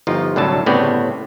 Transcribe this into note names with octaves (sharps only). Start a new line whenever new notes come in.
G1 F3 D#4 F4
C2 A2 D3 F#3 A5
G1 A2 C#3 B3 C4 D5